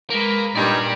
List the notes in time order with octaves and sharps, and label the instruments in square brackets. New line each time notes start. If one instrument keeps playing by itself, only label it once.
[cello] G#3 B4 [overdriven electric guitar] A#3
[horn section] G2 D#4 [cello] A#2 [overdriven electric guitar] G4 D5